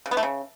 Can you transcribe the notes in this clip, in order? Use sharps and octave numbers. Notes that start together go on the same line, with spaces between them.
C#3
B3
A3
C#3